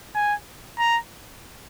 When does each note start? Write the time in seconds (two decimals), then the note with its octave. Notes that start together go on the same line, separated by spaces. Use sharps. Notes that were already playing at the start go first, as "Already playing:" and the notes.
0.15 G#5
0.79 A#5